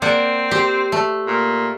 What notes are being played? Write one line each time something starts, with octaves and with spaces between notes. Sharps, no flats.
A#3 C4 D5 F#5
G4 C5
A3
A#2